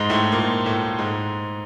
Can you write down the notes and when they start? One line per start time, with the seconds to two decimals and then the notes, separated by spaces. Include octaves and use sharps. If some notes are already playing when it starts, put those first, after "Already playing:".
Already playing: G#2 G#3
0.10 A2 A3
0.32 A#2 A#3
0.66 A2 A3
0.98 G#2 G#3